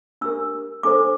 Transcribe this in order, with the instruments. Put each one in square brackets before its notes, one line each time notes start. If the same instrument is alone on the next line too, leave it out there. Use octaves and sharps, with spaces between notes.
[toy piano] D4 G4 A#4 E6
D4 A4 C5 D6